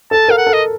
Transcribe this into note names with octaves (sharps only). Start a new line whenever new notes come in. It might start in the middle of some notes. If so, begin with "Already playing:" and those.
A4 A5
A#4 F5
F#5
A4
D#5